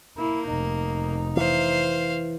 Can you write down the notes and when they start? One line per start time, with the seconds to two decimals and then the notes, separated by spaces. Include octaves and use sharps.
0.18 A#3 E4
0.47 F1 D#4
1.37 E3 C5 F5